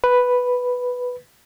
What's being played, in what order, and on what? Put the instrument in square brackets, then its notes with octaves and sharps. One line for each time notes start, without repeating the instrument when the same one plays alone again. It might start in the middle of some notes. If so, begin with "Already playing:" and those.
[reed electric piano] B4